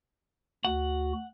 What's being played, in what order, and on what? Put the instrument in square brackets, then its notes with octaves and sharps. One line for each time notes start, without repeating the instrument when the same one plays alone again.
[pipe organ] D2 F#4 [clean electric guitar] F#5